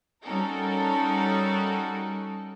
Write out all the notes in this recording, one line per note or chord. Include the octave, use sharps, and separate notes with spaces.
G3 C#4 D#4 F#4 A4 A#4